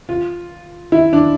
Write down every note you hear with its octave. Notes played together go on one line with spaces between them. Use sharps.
F4
E4
D4